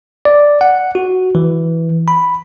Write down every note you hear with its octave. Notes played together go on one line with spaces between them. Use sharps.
D5
F#5
F#4
E3
B5